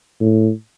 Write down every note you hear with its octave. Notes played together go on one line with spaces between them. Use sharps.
A2